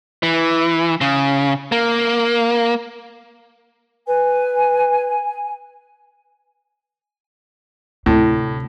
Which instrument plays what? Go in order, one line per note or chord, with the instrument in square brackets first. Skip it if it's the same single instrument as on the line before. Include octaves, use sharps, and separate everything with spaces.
[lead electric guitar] E3
C#3
A#3
[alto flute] B4 [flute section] G#5
[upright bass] D2 C3 [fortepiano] A2